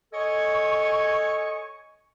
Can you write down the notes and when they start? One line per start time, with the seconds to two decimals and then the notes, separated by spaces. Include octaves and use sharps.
0.13 A4 C#5 D#5 G#5 C#6